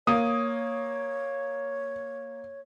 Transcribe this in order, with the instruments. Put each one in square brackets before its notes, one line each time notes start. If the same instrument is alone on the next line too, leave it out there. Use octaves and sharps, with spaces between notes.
[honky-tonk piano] A#3 [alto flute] C#5 [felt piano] D#6